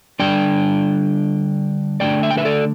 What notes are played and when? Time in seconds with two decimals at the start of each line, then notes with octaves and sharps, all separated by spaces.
0.19 D3 G3 D4 D5 G5
2.00 D3 A3 D4 D5 G5
2.23 E5
2.31 G5
2.37 B4 E5
2.45 A4 D5